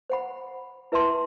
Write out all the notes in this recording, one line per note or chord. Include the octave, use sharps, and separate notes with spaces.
C5 F#5 B5
E4 B4 E5 A5 C6